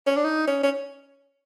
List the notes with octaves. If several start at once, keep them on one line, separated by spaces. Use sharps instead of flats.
C#4
D4
D#4
C#4
C#4